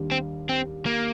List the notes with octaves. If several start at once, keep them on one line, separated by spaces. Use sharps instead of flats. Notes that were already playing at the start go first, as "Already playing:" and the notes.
Already playing: D#2 D#3 G3 D4
C4
C4
A#3